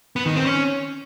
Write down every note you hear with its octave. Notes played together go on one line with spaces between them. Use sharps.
B3
D#3
C4
C#4